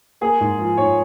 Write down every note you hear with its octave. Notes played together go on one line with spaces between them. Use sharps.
A#3 G#4
G#2
F3
G#2 C#5